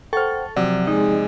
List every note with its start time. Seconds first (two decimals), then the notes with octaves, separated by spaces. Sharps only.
0.13 A4 C5 F#5 G5 C#6 F6
0.56 C3 F3 F#3 D5
0.87 G#3 D#4